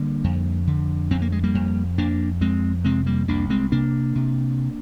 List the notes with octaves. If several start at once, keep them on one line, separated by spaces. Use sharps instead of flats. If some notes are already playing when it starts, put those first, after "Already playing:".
Already playing: D3 G3 A#3
F2
D3
F2 C4
A#3
G#3
G3 A#3
F2
F2 A#3 D4
F2 G#3 C4
C3 G#3 C4
G3 A#3
C2 A#3 D4
G#3 C4
C3 A#3 D4
C3